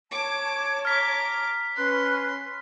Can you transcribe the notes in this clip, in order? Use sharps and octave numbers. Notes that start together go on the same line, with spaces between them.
C#5 A5 D6
A#5 D6 F6 B6
C#4 B4 C6 F#6